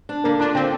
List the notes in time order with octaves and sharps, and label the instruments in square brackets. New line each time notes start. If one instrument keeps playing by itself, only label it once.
[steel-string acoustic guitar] D4
[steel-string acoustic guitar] D3 [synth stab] A#3
[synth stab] D4 [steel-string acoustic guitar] F4
[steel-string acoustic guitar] D3 [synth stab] C4